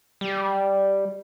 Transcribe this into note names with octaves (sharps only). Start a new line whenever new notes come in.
G3